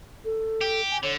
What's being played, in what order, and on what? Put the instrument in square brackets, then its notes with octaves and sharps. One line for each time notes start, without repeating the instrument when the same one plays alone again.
[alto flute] A4
[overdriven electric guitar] G4
[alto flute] G#5
[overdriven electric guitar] D3 [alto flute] C#5